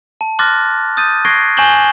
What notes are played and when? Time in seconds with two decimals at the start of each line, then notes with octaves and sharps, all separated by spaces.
0.21 A5
0.39 C6 D6 F6 F#6 A6 A#6
0.97 D#6 G6 A6 D#7
1.25 C#6 F#6 G#6 A#6 C7 D7
1.57 G#5 C#6 G6 E7 F#7 G7